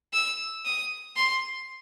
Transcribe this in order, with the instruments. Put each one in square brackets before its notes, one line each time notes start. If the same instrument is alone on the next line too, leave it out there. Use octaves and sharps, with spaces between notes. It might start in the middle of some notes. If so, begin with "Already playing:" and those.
[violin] E6
D#6
C6